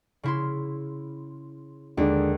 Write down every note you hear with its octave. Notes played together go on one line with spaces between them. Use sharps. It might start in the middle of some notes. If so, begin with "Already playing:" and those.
C#3 E4 C6
D#2 D3 G#3 D4